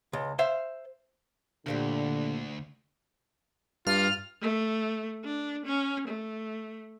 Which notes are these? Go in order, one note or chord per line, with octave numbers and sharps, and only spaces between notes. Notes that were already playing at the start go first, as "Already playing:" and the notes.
C#2
C5 E5 F5
D2 A#2 D3 C4 G4
G2 F4 F6
A3
D4
C#4
A3